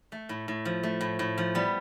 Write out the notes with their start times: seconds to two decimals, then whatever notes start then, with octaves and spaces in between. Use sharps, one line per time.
0.12 A3
0.29 A2
0.48 A2
0.65 F3
0.83 A3
1.01 A2
1.19 A2
1.38 F3
1.55 G3 B3